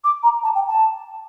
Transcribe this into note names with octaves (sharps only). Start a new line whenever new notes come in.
D6
A#5
A5
G5
A5